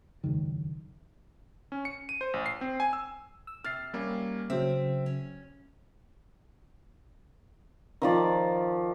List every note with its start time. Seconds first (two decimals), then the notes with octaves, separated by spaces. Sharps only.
0.24 E1 C#2 F#2 D#3
1.72 C#4
1.85 C#7
2.09 D#7
2.21 C5
2.34 A1
2.46 C7
2.61 C4
2.80 G#5
2.93 E6
3.47 E6
3.64 C3 F6 A6 C7
3.93 G3 A#3 C#4
4.50 C#3 F#3 C4 E5
5.06 C#4
8.02 D#3 F3 D5